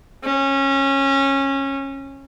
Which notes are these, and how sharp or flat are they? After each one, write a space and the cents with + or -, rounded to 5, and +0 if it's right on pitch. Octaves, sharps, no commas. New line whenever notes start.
C#4 -20